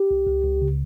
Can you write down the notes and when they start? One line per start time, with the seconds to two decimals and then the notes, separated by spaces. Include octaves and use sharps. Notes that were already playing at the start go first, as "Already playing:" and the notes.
Already playing: G4
0.11 C2
0.27 C#2
0.44 C#2
0.61 C#3